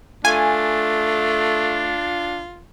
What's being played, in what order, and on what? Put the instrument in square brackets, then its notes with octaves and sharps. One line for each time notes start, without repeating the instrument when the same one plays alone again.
[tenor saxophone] A3 [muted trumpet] D4 [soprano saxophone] F4 [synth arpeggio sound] G#5